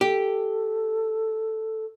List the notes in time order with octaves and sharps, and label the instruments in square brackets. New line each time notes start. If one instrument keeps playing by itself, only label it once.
[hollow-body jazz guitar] G4 [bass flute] A4